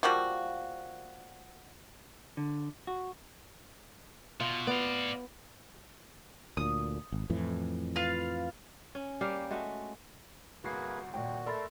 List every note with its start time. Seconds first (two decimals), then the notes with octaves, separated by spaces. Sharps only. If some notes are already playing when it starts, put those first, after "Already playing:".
0.03 F3 G3 A#3 F#4
2.37 D3
2.87 F#4
4.40 B2 F4
4.67 B3 D5 F5
6.57 D2 A#2 D#6
7.12 G#1
7.30 F2 A2 E3
7.96 F4 B4 F5
8.95 C#4
9.21 G3 A#3 G4 F5
9.51 G#3 A3 F#4
10.64 G1 C2 A#3 F#4 G#4 B4 C7
11.14 D#2 A#2 F#4 G5
11.46 A3 A4 A#4 D5 B5 C6 A6